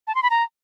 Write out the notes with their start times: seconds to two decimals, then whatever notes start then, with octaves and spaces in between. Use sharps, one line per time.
0.07 A5
0.15 C6
0.23 B5
0.31 A#5